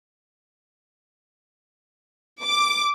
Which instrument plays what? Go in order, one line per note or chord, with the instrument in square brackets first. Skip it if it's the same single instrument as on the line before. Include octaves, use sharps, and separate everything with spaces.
[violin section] D6